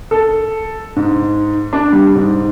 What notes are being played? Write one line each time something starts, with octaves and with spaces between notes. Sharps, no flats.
A4
G#2
D4
G3
G#2